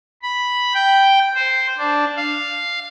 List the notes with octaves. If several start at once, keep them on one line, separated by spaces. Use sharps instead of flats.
B5
G5
C5
D4
F5